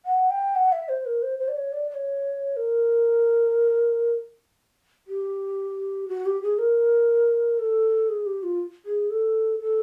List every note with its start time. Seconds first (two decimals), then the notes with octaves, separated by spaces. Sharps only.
0.05 F#5
0.30 G5
0.55 F#5
0.72 E5
0.89 C5
1.06 A#4
1.22 C5
1.39 C5
1.48 D5
1.56 C#5
1.72 D5
1.90 D5
1.94 C#5
2.56 A#4
5.07 G4
6.08 F#4
6.26 G4
6.42 G#4
6.58 A#4
7.59 A4
8.09 G#4
8.26 G4
8.43 F4
8.85 G#4
9.10 A4
9.60 A4